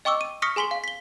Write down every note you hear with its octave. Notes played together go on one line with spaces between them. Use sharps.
D#5 G5 C#6 D6 E6
D#7
C#6 D#6 F6 A#6 B6 C#7
G#4 G#5 C6 B6 G7
F5
B6 G7